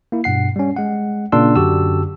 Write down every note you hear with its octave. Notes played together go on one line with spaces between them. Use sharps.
A#3 E4
G2 B2 F#5 C7
G3 C#4
G#3 F#5
A#2 C#3 A#3 D4 C6 E6
F#2 D3 F#4 G4 A5 E6